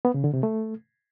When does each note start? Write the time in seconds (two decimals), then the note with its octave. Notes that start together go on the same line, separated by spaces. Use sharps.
0.05 B3
0.14 C#3
0.24 D3
0.34 C3
0.43 A3